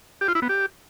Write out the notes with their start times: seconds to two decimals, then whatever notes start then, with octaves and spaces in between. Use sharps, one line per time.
0.21 G4
0.28 F4
0.35 E4
0.42 B3
0.49 G4